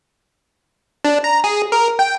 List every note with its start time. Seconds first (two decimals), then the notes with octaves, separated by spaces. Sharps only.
1.04 D4
1.24 A#5
1.44 G#4
1.72 A#4
1.99 G5